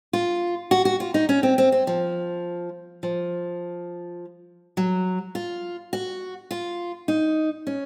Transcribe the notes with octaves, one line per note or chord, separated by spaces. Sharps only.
F4
F#4
F#4
F4
D#4
C#4
C4
C4
C4
F3
F3
F#3
F4
F#4
F4
D#4
C#4